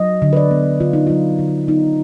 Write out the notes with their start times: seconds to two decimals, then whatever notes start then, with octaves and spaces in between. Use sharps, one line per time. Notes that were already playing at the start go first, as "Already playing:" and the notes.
Already playing: F#3 D#5
0.22 D3
0.33 B4
0.37 D5
0.51 B3
0.80 D3 F4
0.93 D#4
1.07 F#3 F4
1.39 D3
1.68 B3 D#4